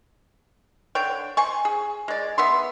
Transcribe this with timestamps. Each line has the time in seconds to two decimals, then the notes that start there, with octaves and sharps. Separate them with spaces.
0.95 D3 D4 C#5 G5
1.37 C5 G#5 C#6
1.65 G#4
2.08 G#3 D5
2.38 B3 E5 C6